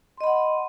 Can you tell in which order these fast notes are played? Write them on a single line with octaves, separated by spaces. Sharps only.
C6 D#5 B5 F#5